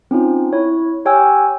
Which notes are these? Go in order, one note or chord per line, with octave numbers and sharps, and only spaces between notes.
C4 C#4 D#4 F4
E4 C#5
G4 C#5 G5 G#5 E6 F6